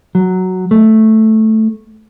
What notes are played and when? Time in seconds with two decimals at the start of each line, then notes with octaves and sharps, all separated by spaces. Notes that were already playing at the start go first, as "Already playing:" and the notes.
0.15 F#3
0.71 A3